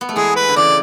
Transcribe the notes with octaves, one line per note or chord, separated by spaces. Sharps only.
B3
A3
E3 G#3 G#4
B4
D3
C#3 E3 D5